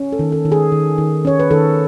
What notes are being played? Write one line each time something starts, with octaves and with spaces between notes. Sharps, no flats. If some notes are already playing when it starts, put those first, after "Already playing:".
Already playing: C#4
A4
D#3
A4
D#3
G#4
D#3
D#3
C#4 C#5
B4
D#3 A4